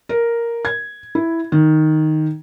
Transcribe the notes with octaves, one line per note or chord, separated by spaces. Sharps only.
A#4
G#6
E4
D#3